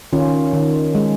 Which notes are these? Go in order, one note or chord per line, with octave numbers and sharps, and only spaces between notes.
D#3 C#4 F4
D#3
G#3